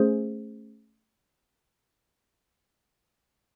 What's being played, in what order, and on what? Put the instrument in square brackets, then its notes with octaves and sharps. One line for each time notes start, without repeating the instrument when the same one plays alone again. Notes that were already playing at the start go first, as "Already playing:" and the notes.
Already playing: [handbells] A3 C#4 G#4 C5